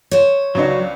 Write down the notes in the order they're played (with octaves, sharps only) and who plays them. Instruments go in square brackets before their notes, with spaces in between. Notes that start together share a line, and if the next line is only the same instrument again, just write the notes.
[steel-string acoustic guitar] C5 C#5
[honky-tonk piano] C#2 B3 D4 [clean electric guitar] F#3